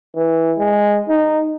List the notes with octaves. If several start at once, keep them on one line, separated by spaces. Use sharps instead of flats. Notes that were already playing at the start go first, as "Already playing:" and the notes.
E3
G#3
D#4